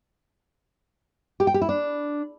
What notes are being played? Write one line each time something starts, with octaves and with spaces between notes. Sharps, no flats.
G4
G5
G4
E4
D4